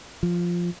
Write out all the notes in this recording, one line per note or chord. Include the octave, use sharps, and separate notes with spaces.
F3